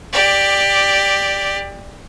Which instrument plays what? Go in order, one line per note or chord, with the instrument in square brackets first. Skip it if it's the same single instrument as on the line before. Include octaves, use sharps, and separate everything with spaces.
[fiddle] G4 D5